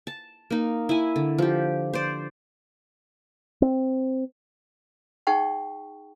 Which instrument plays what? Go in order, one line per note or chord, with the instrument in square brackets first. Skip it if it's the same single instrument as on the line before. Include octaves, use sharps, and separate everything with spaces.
[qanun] A5
A#3 D#4
E4 G#5
D3
F3 G4
C5 D5
[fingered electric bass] C4
[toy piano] D#4 G#4 F#5 G5 A5 C#6